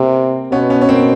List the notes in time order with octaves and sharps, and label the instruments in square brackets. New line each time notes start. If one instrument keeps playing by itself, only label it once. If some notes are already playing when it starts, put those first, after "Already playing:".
Already playing: [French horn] C3 [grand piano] A#3 C4
[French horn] B2 [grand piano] B3 C#4
[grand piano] B3 C#4
C#4
A#3 C4